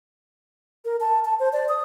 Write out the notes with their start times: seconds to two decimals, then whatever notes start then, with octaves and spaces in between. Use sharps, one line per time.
0.85 A#4
1.00 A5
1.25 A5
1.39 C5
1.53 D5
1.69 D#6